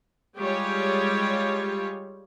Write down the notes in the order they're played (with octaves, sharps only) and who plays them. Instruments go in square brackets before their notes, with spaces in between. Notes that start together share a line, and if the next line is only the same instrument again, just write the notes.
[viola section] G3 G#3 F4 G4 C#5